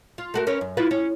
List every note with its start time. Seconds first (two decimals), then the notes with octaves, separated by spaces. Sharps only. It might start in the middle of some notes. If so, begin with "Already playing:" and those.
0.18 F4
0.34 A3 F#4 A#4
0.47 C#4 A#4 B4
0.61 F#2
0.77 E4 F4 B4
0.91 C#4